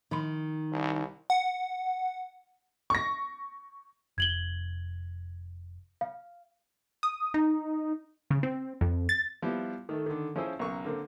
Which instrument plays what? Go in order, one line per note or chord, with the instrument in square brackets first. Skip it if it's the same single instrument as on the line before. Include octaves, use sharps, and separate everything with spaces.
[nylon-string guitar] D#3 [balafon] F3 B5 C6
[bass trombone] C2
[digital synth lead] F#5
[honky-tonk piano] C#6 A#6
[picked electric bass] F1 [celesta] G#6 F#7 G7
[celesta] F5
[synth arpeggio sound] D#6
D#4
C#3
C4
F2
A6
[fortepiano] F3 G3 B3 E4
D#3 A3 A4
D3 D#3
F3 C#4 E4 G#4 C5 E6
B1 C#3 A#4 C#6
D3 A#3 C4